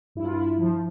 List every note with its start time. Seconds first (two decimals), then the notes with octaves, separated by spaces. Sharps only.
0.15 G2 E4
0.25 F4
0.33 E4
0.58 F3